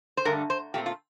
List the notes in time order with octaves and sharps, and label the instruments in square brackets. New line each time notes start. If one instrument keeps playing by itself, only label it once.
[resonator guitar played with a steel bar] C5
G2 D3 A3 A#4
C5
A#2 A3 C4 G4
F4